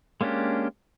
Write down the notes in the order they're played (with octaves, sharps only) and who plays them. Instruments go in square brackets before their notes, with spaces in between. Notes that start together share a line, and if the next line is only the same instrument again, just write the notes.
[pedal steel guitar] G#3 A#3 C#4 D4 G4